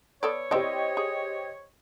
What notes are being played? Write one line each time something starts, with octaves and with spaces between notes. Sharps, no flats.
B3 A4 C#5 D5
C4 E4 G4 C5 D5 D#5
G#4